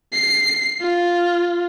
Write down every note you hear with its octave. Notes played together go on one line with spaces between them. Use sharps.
C7
F4